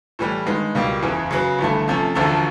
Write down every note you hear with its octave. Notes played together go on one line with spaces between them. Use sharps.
A2 E3 G3
G2 D#3 G#3 B3
C#2 B2 G3 A#3
F#1 E2 C#3 E3
C#3 F#3 B3
G1 G2 E3 A3
C3 F3 A3 C#4
E1 D2 D3 F3 A3